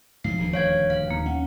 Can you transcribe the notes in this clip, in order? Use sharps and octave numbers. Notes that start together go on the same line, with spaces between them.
G#2 F3 F#3 C7
D#1 D2 G2
C#5 F5 G#6
F5
D#2 A#3
C#4 F#5